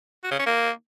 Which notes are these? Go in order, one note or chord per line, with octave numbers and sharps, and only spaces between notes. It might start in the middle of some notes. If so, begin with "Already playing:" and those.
F#4
C#3
C#4
A#3